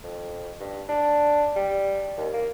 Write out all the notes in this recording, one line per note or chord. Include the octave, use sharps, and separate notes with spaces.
F2
G2
D4
G3
D#2
A#3